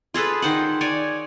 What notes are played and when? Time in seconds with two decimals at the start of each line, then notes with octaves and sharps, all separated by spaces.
0.14 F4 G#4 A4 B4
0.42 D#3 C5 F#5
0.81 C#5 D5 G#5